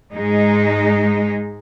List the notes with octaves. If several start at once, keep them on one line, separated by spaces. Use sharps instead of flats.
G#2 G#3 D#4